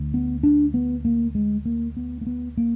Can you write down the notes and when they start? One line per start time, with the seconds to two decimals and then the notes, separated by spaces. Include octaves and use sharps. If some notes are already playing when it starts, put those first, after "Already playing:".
Already playing: D2 D3
0.14 B3
0.43 D4
0.74 B3
1.05 A#3
1.35 G#3
1.66 A#3
1.97 B3
2.21 A#3
2.27 B3
2.57 A#3